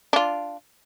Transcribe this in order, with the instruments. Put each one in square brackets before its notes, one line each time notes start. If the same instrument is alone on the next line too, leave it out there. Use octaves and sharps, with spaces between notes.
[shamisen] D4 F4